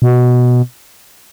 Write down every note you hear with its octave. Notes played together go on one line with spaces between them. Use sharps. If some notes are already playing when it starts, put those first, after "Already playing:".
B2